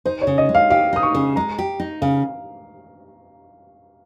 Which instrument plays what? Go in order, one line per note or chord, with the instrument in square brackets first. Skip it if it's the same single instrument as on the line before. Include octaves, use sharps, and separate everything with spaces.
[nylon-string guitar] D#4 [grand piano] C5
[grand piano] C#5
[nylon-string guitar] C#3
[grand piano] D#5
[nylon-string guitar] G#3
[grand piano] F5
[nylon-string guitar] G4 [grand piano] F5
[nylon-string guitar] D#4 [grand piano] D#6
[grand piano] C#6
[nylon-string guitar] C#3
[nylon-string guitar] G#3 [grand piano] A#5
[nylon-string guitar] G4
D#4
[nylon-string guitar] C#3 [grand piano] F5